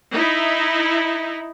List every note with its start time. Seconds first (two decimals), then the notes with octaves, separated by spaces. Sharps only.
0.13 D#4 E4